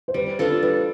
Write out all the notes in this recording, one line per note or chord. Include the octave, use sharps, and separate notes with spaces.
C5
G3 B4
D4 F4 A4 B4
G3 B4